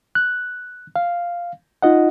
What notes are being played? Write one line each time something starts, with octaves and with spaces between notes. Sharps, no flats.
F#6
F5
D#4 F4 D#5 F#5